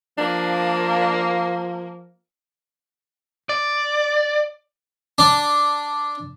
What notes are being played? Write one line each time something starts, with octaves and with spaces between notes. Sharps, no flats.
F3 A#3 D4
D5
D4